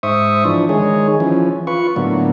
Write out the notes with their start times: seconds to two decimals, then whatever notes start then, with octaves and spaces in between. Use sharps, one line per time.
0.03 G#2 C5 E5 C#6 D#6
0.45 E3 F3 D4
0.69 D#3 G#3 G#4 C#5
1.20 E3 F3 C#4
1.67 F4 B4 C#6
1.96 A2 D3 F#3 A#3 B3